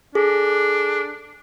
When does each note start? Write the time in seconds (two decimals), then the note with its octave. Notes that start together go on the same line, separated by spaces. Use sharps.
0.15 D4 G#4 A4